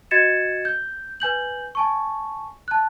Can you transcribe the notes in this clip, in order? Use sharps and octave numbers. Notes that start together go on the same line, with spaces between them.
F#4 D#5 G#6 A6 C#7 E7
G6
B4 G#5 G6 F#7
G#5 A5 C#6
A5 F#6